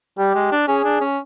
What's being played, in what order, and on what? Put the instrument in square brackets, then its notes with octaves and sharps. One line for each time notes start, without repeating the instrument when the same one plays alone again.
[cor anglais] G3 [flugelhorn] G4
[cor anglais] G#3
D4
[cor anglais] C#4 [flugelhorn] G#4
[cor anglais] D4
C#4